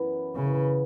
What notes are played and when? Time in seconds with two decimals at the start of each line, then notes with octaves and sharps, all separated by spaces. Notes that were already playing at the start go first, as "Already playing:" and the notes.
Already playing: F#2 E3 B3
0.35 F#2 C#3 E3 B3